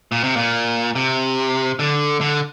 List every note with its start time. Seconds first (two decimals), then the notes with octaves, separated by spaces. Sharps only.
0.12 A#2
0.24 C3
0.36 A#2
0.95 C3
1.79 D3
2.21 D3